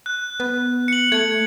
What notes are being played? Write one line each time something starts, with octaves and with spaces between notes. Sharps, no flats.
F#6
B3
C#7 F#7
A3 G#6 C#7